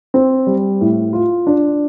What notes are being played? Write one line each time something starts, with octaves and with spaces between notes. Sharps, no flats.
C4
G3
A2
F4
D4